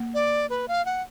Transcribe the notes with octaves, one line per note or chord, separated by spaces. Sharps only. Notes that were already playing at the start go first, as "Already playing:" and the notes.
Already playing: A#3
D5
B4
F5
F#5